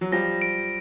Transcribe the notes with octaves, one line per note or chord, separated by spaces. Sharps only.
F#3
F3 G3 A#6
D7